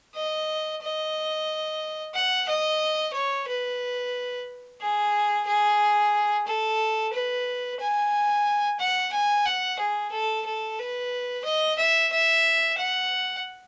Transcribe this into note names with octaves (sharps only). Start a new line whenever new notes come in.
D#5
D#5
F#5
D#5
C#5
B4
G#4
G#4
A4
B4
G#5
F#5
G#5
F#5
G#4
A4
A4
B4
D#5
E5
E5
F#5